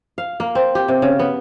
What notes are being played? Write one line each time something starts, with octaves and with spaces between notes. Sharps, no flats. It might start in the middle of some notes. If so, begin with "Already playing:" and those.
F5
A#3
C4
G4
C3
C#3
B3